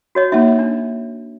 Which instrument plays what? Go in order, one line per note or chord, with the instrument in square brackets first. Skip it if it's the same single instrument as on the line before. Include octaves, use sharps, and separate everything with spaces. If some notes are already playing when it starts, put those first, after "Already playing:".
[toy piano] F#4 C#5 D#5
[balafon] A#3 D#4 [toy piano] E5
[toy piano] D4